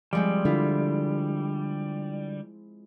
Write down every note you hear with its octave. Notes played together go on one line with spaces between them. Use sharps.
F3 G3 G#3 C4
D3 E4 F4